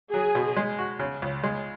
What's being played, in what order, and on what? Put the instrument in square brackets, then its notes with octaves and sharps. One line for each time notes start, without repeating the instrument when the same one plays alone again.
[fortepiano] F#3 [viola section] G#4
[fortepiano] B2
G#3
F#4
C#3
C#2
G#3